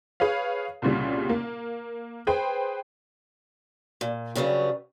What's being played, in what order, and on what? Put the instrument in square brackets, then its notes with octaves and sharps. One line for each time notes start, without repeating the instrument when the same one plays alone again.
[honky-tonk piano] G#4 B4 C#5 F5
C2 A#2 C#3 G3
A#3
G#4 B4 C5 G5
[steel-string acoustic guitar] A#2
G2 C#3 F#3 G3 B4